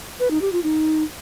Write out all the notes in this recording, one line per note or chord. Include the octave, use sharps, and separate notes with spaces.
B4
D#4
G4
F4
D#4